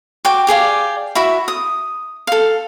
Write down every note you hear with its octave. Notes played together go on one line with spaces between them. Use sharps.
F#4 G5 D6
G4 G#4 D5 F5
E4 F#4 E5
D#6
A4 F5